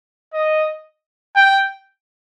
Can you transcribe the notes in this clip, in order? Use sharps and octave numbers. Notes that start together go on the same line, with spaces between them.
D#5
G5